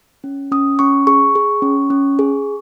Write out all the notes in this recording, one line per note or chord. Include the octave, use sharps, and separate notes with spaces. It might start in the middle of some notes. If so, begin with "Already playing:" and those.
C#4
C#4 D#6
C#4 C#6
G#4 C#6
G#4
C#4
C#4
G#4